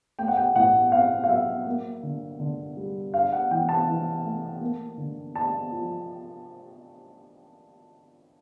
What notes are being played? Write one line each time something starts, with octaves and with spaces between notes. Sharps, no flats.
A3 G5
F#5
G5
A2 F#5
C4 F5
F5
F#3 E5
A#3
D3
D3
G3
D4 F5
F#5
E3 G5
A5
E3
A3
A#3
D3
D4 A5
F3